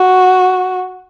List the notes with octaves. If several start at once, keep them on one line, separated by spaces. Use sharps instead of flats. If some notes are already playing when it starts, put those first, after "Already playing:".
Already playing: F#4